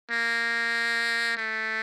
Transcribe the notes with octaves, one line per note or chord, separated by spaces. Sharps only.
A#3
A3